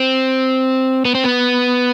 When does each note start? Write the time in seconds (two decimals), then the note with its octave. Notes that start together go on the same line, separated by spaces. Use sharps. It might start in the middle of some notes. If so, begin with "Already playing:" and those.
Already playing: C4
1.05 B3
1.15 C4
1.24 B3